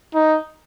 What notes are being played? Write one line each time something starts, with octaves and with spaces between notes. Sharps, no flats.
D#4